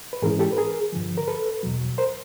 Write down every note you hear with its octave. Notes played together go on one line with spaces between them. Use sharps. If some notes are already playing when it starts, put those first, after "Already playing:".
B4
G#2 E3 G#3 C#4 E4 G#4 A#4
G4 A4
B4
G#4 A#4
G2 D3 F3
A#4
A4 B4
E2 B2 F#3
A#4 C5